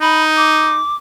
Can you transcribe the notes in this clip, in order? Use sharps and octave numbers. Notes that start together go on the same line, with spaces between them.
D#4 B5
D6